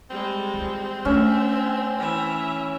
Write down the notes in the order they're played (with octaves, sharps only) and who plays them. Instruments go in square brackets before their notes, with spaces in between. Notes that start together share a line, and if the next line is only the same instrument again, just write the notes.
[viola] G3 G#3 [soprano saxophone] C4
[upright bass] E3 F4
[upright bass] A3 D4 [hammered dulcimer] C#4 [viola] E5
[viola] E3 E5